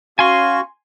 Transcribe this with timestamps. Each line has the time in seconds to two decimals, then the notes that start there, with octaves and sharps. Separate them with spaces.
0.19 C#4 F#4 F5 G#5 C6 C#6